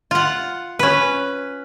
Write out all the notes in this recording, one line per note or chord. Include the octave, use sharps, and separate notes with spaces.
F4 F#5
C#4 B4